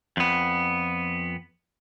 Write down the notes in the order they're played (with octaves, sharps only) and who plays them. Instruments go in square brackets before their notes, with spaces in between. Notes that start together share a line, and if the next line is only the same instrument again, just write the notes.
[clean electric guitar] F2 B3